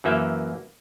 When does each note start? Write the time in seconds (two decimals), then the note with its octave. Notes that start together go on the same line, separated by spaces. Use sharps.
0.04 F#2 E3 A#3 E5